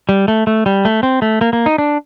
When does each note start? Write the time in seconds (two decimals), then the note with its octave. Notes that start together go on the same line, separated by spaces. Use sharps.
0.09 G3
0.28 A3
0.47 A3
0.66 G3
0.85 A3
1.03 C4
1.22 A3
1.41 A#3
1.53 A#3
1.66 D#4
1.78 D4